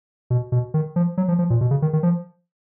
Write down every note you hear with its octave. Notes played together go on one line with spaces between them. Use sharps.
B2
B2
D#3
F3
F#3
F3
F3
A#2
B2
C#3
D#3
D#3
F3